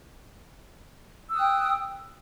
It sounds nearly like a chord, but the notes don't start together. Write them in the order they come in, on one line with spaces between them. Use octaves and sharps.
E6 D#6 F#6 G5